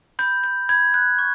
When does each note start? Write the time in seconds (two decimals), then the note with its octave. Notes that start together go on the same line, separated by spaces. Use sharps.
0.19 B5 G6
0.44 G6
0.69 B5 G#6
0.94 F#6
1.19 C#6